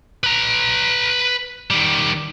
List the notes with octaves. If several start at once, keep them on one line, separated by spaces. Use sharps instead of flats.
B4 A#5
D#3 G3